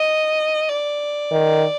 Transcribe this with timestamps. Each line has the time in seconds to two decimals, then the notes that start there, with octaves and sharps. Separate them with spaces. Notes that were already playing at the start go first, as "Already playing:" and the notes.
Already playing: D#5
0.69 D5
1.31 D#3